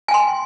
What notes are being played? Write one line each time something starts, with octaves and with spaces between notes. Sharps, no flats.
G5 G#5 C6